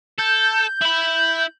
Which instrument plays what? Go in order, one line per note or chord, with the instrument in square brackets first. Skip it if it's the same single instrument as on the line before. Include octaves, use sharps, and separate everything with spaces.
[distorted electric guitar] A4 [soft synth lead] G6
[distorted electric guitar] E4 B5